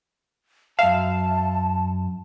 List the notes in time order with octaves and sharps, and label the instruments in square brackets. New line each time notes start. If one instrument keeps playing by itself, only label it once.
[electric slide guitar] F#2 E5 [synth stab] F5 [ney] A5